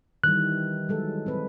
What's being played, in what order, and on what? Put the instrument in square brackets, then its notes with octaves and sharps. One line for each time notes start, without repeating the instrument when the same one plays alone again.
[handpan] D#3 E3 G3 [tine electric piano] F#6
[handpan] F#3 G#3 A4
C4 B4